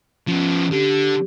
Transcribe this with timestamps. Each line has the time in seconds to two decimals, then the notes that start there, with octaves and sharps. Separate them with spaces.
0.27 F3 B3 C#4
0.71 D3 G4